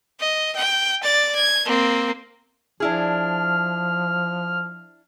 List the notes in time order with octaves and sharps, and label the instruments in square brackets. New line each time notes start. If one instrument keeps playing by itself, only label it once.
[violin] D#5
G5
D5 A6
G#6
A#3 C4
[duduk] F3 [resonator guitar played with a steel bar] D4 E4 G#4 [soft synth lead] F6